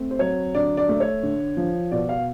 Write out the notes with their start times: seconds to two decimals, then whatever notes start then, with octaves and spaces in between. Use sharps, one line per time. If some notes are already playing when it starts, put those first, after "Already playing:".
Already playing: A3 C4
0.11 C5
0.19 F#3 C#5
0.55 D3 D5
0.77 D5
0.89 A3
1.00 C#5
1.23 D3
1.57 F3
1.92 B2 D5
2.09 F5